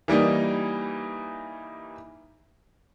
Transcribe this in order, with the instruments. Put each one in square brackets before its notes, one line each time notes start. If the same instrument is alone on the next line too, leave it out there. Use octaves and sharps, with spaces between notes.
[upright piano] E3 G3 A#3 D#4